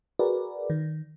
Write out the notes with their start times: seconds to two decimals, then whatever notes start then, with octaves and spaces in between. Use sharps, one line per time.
0.19 F#4 G#4 A#4 B4 D5
0.70 D#3